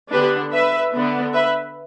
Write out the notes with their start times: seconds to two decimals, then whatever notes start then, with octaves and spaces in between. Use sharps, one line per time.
0.12 D3 B3 D4 G4 B4
0.52 B4 E5
0.93 D3 B3 D4
1.34 B4 E5